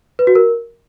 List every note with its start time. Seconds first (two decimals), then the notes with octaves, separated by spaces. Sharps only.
0.19 B4
0.27 F#4
0.35 A#4